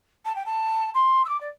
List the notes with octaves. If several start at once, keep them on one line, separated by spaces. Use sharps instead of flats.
A5
G5
A5
C6
E6
D6
D5